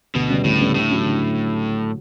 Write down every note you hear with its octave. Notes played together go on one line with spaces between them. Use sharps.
D2 B2
C#3 G3 B3
D2 A2
C#3 G3 B3
A2 D3
F#3 C#4
D3